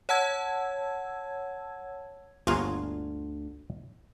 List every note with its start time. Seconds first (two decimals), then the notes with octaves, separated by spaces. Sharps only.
0.09 C#5 F#5 A5 E6 G#6
2.47 G1 D2 D3 A#3 F4 F#4 G#4